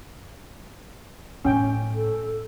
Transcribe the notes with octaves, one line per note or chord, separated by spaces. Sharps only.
A2 C#4 G5
A4